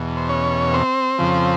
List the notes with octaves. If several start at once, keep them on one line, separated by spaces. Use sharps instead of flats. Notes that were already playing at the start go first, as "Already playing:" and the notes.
Already playing: E2 B2
C5
C#4 C#5
C4 C5
F2 C#3 F3